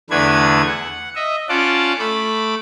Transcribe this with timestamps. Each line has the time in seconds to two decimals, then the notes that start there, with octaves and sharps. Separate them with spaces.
0.10 E2 D3 A3 D4 B4 G#6
0.66 F#5
1.16 D#5 E5
1.49 C#4 F4 D5 F#5 A5 D6
1.99 A3 B5 D6